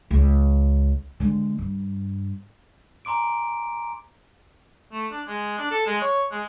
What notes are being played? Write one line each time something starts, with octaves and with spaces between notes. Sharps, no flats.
C#2
D3 G#3
G2
G#5 A#5 C6 D6 D7
A3
D4
G#3
D4
A4
G#3
C#5
G#3